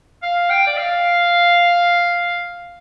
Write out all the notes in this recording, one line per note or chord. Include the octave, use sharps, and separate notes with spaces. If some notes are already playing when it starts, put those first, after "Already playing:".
F5
G5
D5
F5